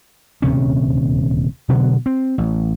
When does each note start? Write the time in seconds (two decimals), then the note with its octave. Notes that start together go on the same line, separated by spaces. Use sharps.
0.42 D#1 D2 C3 C#4
1.69 B2 D3 F#3 B3
2.06 C4
2.38 A1